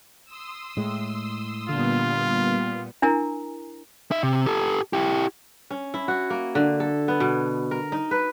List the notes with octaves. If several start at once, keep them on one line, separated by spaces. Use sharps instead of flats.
C6 D#6 E6
A2 G#3
A#2 D3 G3 B3 F4
D4 E4 A#4 G#5 A#5
D#4 E5
C3
G4 A4
E4 G4
C#4
E4
F#4
A#3
D3
A4
B3
B2
A#4
D#4
B4